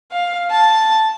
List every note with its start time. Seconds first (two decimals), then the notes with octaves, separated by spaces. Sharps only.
0.12 F5
0.50 A5